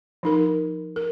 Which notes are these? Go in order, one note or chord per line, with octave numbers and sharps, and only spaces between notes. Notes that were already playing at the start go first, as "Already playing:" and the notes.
F3 D#4 A#4
A#4